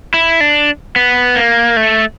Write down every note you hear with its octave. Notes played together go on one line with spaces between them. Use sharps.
E4
D4
B3
A#3
A3